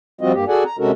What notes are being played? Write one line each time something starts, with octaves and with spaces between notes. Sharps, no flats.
F3 G3 C4 F4 F#4 D#5
G2 A#3 G4
F#4 G#4 A4 D5 F#5 G#5
A#5
C3 G#3 C#4 F#4 A4 A#4